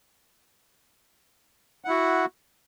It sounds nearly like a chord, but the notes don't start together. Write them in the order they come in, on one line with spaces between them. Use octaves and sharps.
F#5 E4 F#4